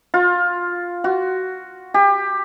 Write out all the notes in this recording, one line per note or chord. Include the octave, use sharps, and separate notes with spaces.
F4
F#4
G4